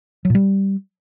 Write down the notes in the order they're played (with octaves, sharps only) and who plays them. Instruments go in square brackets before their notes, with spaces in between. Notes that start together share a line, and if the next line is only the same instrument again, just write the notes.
[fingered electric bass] F#3
A#2
G3